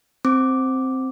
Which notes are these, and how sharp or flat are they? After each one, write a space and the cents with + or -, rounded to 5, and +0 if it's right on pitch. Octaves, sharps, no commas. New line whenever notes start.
C4 +0 D6 +0